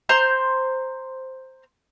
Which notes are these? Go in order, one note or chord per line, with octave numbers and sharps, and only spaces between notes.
C5 A#5 C6 G6